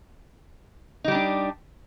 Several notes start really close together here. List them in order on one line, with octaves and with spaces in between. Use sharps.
D#4 G3 G4 D4